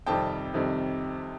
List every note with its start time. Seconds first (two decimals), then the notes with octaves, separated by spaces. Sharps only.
0.06 F2 C3 D#3 G3 G5 A5
0.54 F2 C3 D#3 G3